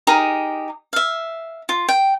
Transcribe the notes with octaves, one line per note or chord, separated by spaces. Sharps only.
D#4 G4 G#4 A#4
E5 F5
F4
G5